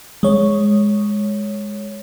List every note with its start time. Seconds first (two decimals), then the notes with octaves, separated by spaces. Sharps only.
0.23 G#3 C#5